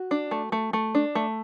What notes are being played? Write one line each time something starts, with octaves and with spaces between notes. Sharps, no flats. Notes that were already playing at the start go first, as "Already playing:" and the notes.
Already playing: F#4
D4
A3
A3
A3
D4
A3